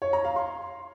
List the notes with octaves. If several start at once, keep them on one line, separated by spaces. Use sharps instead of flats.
C#5
A#5
F5
C6